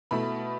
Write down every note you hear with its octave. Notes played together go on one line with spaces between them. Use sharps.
B2 A3 E4 B5